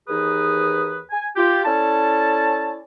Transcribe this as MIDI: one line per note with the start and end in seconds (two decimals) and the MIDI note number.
0.08 1.01 39
0.08 1.01 52
0.08 1.01 63
0.08 1.01 68
0.08 1.01 71
0.08 1.01 87
1.11 1.27 80
1.36 1.64 65
1.36 1.64 67
1.65 2.78 61
1.65 2.78 64
1.65 2.78 69
1.65 2.78 74
1.65 2.78 81